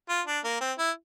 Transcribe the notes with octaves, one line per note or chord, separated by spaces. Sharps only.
F4
D4
A#3
C4
E4